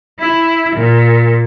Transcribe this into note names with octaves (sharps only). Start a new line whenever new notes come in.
E4
A#2